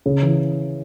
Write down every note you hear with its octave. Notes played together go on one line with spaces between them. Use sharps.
C#3
E3